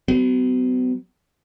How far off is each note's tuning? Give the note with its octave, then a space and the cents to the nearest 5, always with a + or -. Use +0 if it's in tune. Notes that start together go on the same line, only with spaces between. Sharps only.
F#3 +35 B3 +40